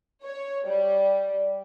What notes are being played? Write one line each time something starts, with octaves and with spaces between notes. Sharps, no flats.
C#5
G3